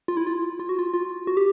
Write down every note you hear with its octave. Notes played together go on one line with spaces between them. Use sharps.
F4
E4
F4
F4
F#4
F4
F4
F#4
G4